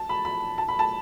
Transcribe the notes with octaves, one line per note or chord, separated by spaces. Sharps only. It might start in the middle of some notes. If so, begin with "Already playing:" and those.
Already playing: A5
B5
B5
A5
B5
A5